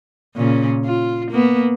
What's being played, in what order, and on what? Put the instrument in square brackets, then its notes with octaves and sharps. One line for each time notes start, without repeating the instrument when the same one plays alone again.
[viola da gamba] A#2 C#3 C#4
F4
A#3 B3